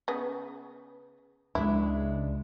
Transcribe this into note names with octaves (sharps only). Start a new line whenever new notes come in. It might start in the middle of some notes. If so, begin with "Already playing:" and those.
C#3 B3
C#2 G#3 D4 E4